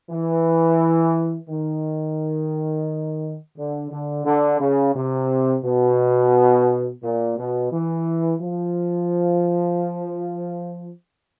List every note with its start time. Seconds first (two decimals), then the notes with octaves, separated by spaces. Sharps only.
0.10 E3
1.49 D#3
3.57 D3
3.91 D3
4.25 D3
4.60 C#3
4.94 C3
5.64 B2
7.02 A#2
7.37 B2
7.71 E3
8.41 F3